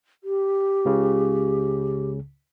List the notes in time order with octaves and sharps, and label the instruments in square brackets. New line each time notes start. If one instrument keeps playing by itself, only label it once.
[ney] G4
[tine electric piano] C#2 C#3